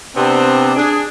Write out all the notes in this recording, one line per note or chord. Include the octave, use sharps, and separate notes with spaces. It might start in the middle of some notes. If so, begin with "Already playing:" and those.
C3 B3 C4 D4
D4 G#4